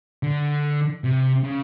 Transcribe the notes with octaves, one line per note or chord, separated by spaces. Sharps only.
D3
C3
C#3